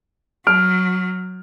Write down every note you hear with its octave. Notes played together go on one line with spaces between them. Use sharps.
F#3 F6 D7